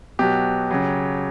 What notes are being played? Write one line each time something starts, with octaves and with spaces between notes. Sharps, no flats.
B2 F#3 G4
C#3 F#3